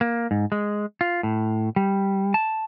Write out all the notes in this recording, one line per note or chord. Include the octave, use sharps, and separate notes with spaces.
A#3
G#2
G#3
F4
A2
G3
A5